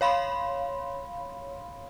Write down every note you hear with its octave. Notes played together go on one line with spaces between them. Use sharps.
C#5 F5 B5 C6